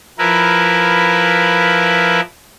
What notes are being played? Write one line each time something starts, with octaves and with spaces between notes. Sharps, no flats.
F3 E4 A#4 B4